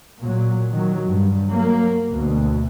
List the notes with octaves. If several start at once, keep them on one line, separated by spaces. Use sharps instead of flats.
A#2 F#3
D#3 F#3
G2
F#3 A#3
D2 B2